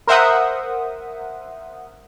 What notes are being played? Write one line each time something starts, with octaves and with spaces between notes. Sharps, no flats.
A#4 C5 E5 F#5 D#6